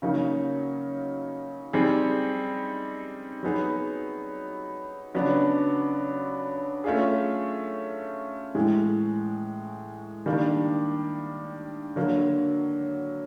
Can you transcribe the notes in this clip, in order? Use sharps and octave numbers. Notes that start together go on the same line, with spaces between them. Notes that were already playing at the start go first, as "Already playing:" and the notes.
C#3 F#3 A#3 D#4
G3 C4 D#4 G#4
F#3 B3 D#4 G#4
C#3 F#3 B3 D4
A3 C#4 F4 G#4
A2 E3 G#3
D#3 G3 A#3 D4
D3 F#3 A#3